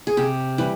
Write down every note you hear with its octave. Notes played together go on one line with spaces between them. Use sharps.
G#4
C3 G4
E3 G3 B4